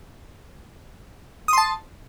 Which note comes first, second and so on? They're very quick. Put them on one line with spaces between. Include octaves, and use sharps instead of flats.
D#6 C6 A5